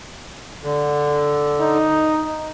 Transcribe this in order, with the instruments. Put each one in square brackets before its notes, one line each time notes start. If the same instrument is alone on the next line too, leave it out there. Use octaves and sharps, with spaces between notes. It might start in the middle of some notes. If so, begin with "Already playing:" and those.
[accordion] D3
[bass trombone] D#4